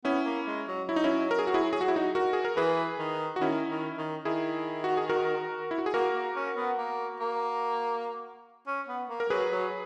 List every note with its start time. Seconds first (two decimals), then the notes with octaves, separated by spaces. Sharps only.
0.04 B3 C#4 E4
0.25 A#3
0.47 G#3
0.68 F#3
0.89 F#3 E4
0.96 D#4
1.04 C#4 E4
1.31 A#4
1.39 G#4
1.47 F#4
1.54 E4 G#4
1.73 G#4
1.81 F#4
1.88 E4
1.96 D#4 F#4
2.15 F#4 A#4
2.33 G#4
2.45 A#4
2.56 E3 G#4 B4
2.99 D#3
3.36 F#4
3.41 D#3 C#4 E4
3.69 D#3
3.98 D#3
4.25 D#3 E4 G#4
4.84 F#4
4.97 G#4
5.09 F#4 A#4
5.71 E4
5.78 F#4
5.86 G#4
5.94 A#3 F#4 A#4
6.15 A#3
6.36 C#4
6.56 B3
6.78 A#3
7.20 A#3
8.67 C#4
8.89 B3
9.09 A#3
9.20 A#4
9.30 F#3 G#4 B4
9.52 F#3